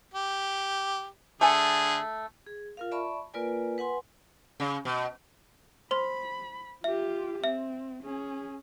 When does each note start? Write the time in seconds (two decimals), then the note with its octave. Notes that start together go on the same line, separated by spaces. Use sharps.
0.14 G4
1.41 D3 A3 G#4 G#5
2.47 G#4
2.77 F4 A#4 F5
2.92 D5 E5 A5 B5 C#6
3.34 A#3 F4 A#4 B4 D5 G#5
3.78 B4 F#5 G#5 C6
4.60 C#3
4.85 B2
5.91 C5 B5 C6
6.84 F4 G4 E5
7.44 C4 E5
8.03 C#4 G#4